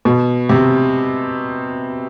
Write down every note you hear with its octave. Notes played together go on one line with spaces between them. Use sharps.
B2
C3